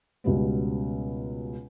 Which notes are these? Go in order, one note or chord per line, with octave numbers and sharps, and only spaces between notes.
C#2 B2 G3 B3